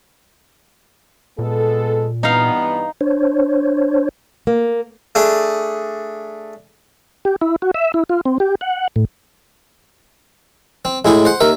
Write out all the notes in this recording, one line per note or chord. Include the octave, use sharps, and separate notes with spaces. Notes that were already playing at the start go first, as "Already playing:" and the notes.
A#2 G#3 B3 A4
G2 E3 B3 D#4 F5
D4 C5 C#5
A#3
A3 D4 G#4
G4
E4
F#4
E5
E4
F4
C4
G4
F#5
A2
C4
A2 G#3 E4 G#4
C5 F#5
D#2 A#4 E5